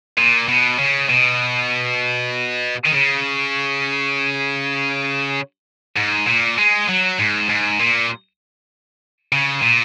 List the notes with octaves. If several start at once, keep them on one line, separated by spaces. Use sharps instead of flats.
A#2
B2
C#3
B2
D#3
C#3
G#2
A#2
G#3
F#3
G#2
G#2
A#2
C#3
A#2